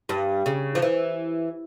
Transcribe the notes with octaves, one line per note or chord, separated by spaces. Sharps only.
G2
C#3
F3
E3